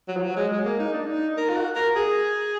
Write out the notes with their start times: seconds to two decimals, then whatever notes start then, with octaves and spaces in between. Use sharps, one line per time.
0.08 F#3
0.17 F3
0.22 F#3
0.37 G#3
0.52 G#3
0.65 A#3
0.80 D#4
0.93 D4
1.07 D#4
1.38 A#4
1.49 F4
1.57 F#4
1.76 A#4
1.96 G#4